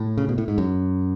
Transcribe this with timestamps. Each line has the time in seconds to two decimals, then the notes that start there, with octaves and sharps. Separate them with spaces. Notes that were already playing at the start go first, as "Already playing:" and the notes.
Already playing: A2
0.17 C#3
0.29 B2
0.38 A2
0.48 G#2
0.58 F#2